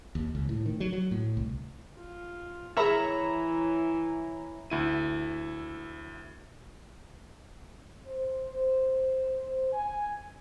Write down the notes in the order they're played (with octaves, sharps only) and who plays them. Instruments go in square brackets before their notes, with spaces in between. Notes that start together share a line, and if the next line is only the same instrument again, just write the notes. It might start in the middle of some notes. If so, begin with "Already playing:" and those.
[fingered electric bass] D#2
C#2
A2
D#3
F#3
F#3
A2
C2
[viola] F4
[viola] E3 [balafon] G#4 A#4 [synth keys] C#5 E5 A#5 [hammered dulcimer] B5
[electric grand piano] D2 E4 D#7
[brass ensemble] C5
G#5